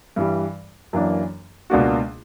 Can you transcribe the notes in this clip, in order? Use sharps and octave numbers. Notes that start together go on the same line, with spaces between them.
G2 E3 G3
F#2 E3 A#3 D4
C#2 B2 A#3 D4 F#4